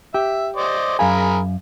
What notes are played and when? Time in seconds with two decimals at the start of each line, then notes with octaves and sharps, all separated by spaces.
0.14 G4 E5
0.57 C5 D5 D#5
0.99 F#2 G#4 A#4 F5 G#5 B5